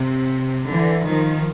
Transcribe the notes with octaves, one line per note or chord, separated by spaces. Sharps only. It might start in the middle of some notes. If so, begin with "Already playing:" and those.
Already playing: C3
D3 E3
D#3 F3